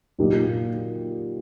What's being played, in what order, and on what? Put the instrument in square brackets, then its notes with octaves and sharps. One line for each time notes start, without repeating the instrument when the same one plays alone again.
[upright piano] A#2 F#3 A#3 D#4 G4